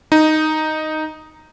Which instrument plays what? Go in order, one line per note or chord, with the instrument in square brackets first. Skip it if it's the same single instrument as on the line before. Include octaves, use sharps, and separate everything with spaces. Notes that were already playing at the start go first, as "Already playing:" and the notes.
[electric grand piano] D#4